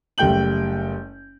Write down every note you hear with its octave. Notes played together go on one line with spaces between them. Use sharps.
F#1 G3 A3 G5 G6 F#7